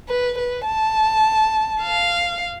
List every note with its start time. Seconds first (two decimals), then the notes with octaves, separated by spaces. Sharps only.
0.09 B4
0.38 B4
0.66 A5
1.82 F5